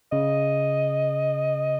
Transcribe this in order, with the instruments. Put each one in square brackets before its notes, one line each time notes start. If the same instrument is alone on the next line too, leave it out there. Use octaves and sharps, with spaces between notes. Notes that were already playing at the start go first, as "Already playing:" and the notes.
[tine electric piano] C#3 [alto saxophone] D#5